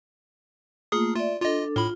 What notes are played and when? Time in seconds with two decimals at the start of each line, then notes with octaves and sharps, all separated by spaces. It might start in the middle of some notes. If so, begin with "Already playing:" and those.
0.92 A3 A#3 F4 G#4 D#6
1.16 F4 D5 E5
1.42 D4 F4 A4 D#5
1.76 A2 F4 B5